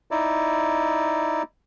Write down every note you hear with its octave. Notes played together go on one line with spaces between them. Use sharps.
D#4 E4 D5